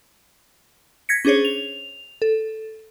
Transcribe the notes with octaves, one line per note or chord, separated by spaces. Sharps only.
G#6 A#6 B6 C#7
C#4 D4 G#4 C5 C#5
F7
A4